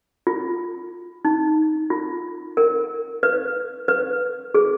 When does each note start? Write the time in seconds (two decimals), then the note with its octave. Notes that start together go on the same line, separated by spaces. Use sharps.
0.27 F4
1.25 D#4
1.90 F4
2.57 A#4
3.23 B4
3.88 B4
4.54 G#4